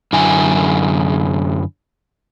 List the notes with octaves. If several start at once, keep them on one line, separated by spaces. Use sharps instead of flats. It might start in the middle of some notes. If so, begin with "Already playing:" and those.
F#2 D3 E4 G#5